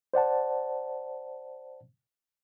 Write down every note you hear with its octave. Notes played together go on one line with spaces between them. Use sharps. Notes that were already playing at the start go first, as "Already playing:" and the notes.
C5 D5 F#5 A5